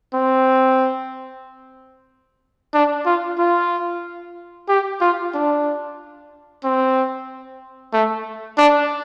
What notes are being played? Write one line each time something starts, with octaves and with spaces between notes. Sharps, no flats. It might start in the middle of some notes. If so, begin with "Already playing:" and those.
C4
D4
F4
F4
G4
F4
D4
C4
A3
D4